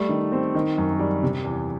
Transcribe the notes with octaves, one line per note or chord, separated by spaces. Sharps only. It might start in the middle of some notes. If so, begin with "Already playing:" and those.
Already playing: G3 A3
D#3
C4
D#3
F#2
G3
C3
E2